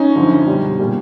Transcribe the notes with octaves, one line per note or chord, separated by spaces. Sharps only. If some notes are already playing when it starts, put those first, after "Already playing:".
Already playing: C#4 D#4
F#2 D3 F3
B2 G3
A#2 G3